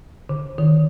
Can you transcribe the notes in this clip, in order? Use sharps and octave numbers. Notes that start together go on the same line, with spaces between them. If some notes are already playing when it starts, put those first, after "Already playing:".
D3
D#3